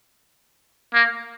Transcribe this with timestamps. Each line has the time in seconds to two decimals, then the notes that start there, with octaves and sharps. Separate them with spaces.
0.94 A#3